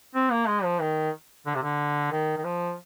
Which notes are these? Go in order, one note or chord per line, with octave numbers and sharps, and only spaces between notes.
C4
A#3
G#3
F3
D#3
D3
C3
D3
D#3
D#3
F3